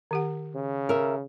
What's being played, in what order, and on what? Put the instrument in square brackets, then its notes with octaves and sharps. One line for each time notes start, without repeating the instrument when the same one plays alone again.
[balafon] D#3 G4 F#5
[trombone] C#3
[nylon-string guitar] A#4 E5